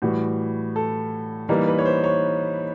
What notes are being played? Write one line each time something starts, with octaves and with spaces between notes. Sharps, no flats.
A2 E3 G3 F#4
A4
E3 G3 A#3 D#4 A#4
B4
C#5
C5
C#5